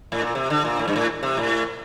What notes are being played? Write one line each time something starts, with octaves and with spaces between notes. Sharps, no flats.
A2
A#2
C3
D3
A#2
A2
G2
A2
C3
A2